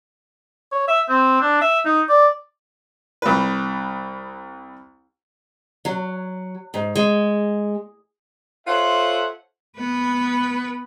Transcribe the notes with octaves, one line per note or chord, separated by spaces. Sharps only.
C#5
E5
C4
D4
E5
D#4
D5
C2 B4
F#3
G#2
G#3
F4 A4 C5 C#5 E5 F#5
B3 B4